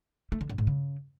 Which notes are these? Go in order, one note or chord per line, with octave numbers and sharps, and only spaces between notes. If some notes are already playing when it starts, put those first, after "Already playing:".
A3
D3
F#2
G#2
C#3